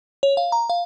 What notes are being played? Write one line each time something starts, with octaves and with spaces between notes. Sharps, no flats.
C#5
F5
A#5
F5